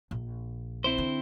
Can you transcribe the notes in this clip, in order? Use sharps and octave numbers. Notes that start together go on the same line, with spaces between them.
A#1
C4 E4 C5
D3